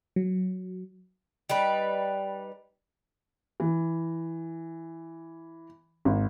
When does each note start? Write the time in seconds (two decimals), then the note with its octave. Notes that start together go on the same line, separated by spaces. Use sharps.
0.16 F#3
1.50 G3 D#4 B4
3.60 E3
6.05 G#1